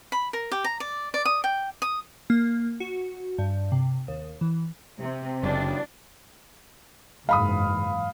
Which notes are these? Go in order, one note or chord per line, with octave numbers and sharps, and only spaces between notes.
B5
A#4
G4
A#5
D5
D5
D#6
G5
D#6
A#3
F#4
G2
C3
D#2
E3
C3
F#1 D4
F#1 G#2 E3 F5 B5 D#6